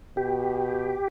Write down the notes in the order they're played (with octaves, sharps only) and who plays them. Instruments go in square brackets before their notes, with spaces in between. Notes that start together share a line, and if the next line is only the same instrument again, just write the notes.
[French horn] B2 [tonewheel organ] G4